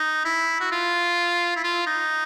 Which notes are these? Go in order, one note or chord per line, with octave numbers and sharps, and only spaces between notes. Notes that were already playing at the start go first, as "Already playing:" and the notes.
Already playing: D#4
E4
F#4
F4
E4
F4
D#4